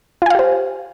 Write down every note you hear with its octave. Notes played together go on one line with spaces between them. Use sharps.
F4 G4 C5 F5 G#5